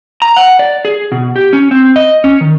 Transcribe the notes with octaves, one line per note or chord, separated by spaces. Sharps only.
A#5
F#5
D5
G#4
B2
G4
C#4
C4
D#5
C#4
D#3